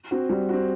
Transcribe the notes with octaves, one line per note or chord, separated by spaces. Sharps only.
C4 F#4
G3
C4 F#4